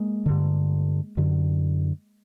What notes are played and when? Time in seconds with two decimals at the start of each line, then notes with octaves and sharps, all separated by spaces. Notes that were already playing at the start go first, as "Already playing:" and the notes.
Already playing: G#3 A#3
0.26 G2 D3
1.17 F#2 D3